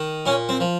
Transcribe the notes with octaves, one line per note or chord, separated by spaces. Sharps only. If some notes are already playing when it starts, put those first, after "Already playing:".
Already playing: D#3
A#2 C#4
C4
F3